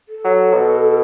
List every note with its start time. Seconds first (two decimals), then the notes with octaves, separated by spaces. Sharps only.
0.09 A4
0.24 F#3
0.54 B2